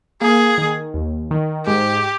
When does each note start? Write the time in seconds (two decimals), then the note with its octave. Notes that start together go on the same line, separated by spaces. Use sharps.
0.21 A#3 G#4
0.58 D#3
0.94 D#2
1.31 D#3
1.66 G#2 G4